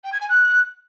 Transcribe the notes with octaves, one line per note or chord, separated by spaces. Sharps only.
G5
G#6
G#5
F#6